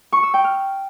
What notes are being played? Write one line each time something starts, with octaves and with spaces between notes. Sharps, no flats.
C#6
E6
G5
F6